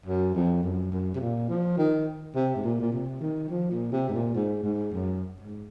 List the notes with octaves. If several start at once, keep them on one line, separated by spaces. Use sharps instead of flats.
F#2
F2
F#2
F#2
C3
A#2
F3
D#3
C3
G#2
A#2
A#2
C3
D#3
F3
A#2
C3
G#2
A#2
G#2
G#2
F#2
G#2